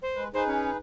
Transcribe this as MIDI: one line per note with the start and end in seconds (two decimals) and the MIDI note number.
0.02 0.23 72
0.15 0.28 56
0.15 0.28 71
0.34 0.77 63
0.34 0.77 68
0.34 0.77 71
0.34 0.46 72
0.47 0.70 61